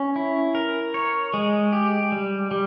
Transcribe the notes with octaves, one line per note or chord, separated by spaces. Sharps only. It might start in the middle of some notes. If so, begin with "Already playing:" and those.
Already playing: C#4
E4
A#4
C#5
G#3
G4
G3
G3